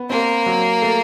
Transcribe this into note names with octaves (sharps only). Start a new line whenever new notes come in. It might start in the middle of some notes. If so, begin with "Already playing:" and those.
Already playing: B3
A#3 C4
F#3
A3